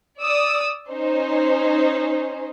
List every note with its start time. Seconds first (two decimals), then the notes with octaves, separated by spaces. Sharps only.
0.21 D5 D#6 E6
0.90 C#4 D#4 C5